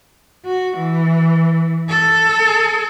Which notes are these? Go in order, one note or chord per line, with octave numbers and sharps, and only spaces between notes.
F#4
E3
A4